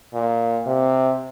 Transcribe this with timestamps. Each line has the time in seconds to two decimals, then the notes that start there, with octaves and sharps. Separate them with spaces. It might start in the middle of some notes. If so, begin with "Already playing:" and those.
0.14 A#2
0.66 C3